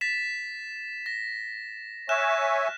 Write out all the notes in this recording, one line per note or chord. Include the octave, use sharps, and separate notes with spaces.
A6 B6 E7
A#6
C#5 E5 G#5 F6 F#6 E7